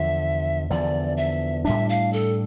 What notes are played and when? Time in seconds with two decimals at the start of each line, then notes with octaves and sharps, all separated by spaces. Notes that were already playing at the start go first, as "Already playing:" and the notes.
Already playing: E2 D3 F3 E5
0.70 E2 D3 F3 D5
1.17 E5
1.65 A2 G3 D4 E5
1.89 F5
2.13 A4